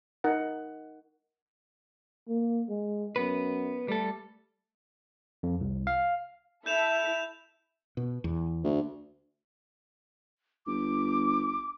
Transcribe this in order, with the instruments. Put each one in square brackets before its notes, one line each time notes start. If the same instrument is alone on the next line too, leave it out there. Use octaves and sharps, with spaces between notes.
[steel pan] D#4 A#4 F#5
[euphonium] A#3
G#3
[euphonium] F#2 [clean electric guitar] B3 B4
[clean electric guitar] G3 A4 [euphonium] A3
[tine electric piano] F2
C2
F5
[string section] E4 A4 E5 [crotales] G6 E7 F7
[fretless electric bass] B2
E2
[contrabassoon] D2
[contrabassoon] G1 [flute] D6